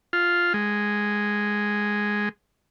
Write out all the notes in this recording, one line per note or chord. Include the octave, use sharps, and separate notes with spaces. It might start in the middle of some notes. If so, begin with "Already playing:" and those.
F4
G#3